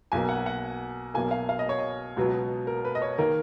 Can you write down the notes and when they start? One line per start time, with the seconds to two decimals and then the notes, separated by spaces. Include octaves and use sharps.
0.12 B1 B2 A#3 G#5
0.29 F#5
0.46 F#5
1.14 B1 B2 A#3 G#5
1.31 F5
1.49 F5
1.59 D#5
1.69 C#5
1.79 D#5
2.16 C#2 B2 F#3 B3
2.67 A#4
2.85 B4
2.95 D#5
3.02 C#5
3.18 D#3 A#3 A#4